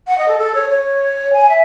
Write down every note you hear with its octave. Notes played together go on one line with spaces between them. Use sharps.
F#5
D#5
A4
A4
C#5
C#5
G#5
E5